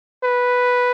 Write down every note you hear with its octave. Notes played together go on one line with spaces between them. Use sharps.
B4